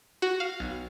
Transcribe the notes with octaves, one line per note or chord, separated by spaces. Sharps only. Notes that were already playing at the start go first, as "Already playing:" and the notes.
F#4
F5
B1